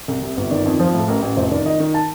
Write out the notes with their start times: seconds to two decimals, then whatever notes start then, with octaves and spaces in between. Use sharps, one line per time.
0.08 C2
0.22 C3
0.37 G1
0.51 D#3 D5
0.65 F2
0.79 F3 C5
0.94 A2 A4
1.08 A1 A#4
1.22 A1
1.37 F1 C5
1.51 D#3 D5
1.65 D#3 D#5
1.80 D#3
1.94 A5